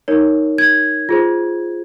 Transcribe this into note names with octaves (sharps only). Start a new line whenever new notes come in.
D#4 A#4 C#5
G#6
F4 G#4 C5